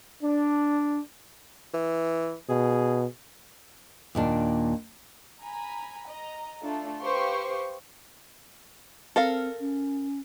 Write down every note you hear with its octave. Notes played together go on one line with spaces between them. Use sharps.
D4
E3
B2 G#4
D#2 A#2 D4
G#5 A#5 B5
D#5 A#5
A3 D4 F4 A4
G4 B4 C5 F5 C6 C#6
C4 A4 A#4 F5
C#4